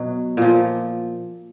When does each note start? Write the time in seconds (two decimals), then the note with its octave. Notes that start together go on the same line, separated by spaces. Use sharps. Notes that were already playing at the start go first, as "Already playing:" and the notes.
Already playing: B2 F#3
0.37 A#2 F3